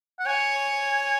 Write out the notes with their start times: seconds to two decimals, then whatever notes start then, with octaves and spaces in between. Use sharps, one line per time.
0.20 F#5
0.27 C#5 G#5